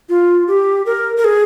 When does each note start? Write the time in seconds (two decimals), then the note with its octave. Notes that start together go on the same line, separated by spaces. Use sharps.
0.09 F4
0.48 G4
0.86 A#4
1.17 A#4
1.24 G#4